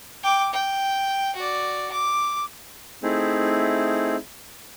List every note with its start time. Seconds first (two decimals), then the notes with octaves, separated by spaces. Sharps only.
0.24 G5 D6
0.54 G5
1.36 F#4 D5
1.92 D6
3.03 A3 C4 D#4 E4 G#4